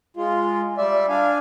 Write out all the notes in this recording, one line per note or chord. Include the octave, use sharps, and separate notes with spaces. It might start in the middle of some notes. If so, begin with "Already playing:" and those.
G#3 F4
G3 D5 E5
D4 F5 G#5